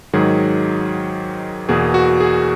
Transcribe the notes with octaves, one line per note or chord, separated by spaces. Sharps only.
G#2 D#3 F#3 G#4
E2 B2 A#3 G#4
F#4
G#4